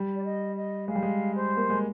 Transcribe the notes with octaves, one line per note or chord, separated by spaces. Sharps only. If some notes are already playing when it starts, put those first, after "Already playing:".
Already playing: G3
D5
D#5
D#5
G#3 F5
G3
G#3
C5
A#3
G#3